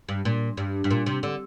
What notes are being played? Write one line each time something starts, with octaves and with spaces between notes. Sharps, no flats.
G2
A#2
G2
G2
A#2
C3
D3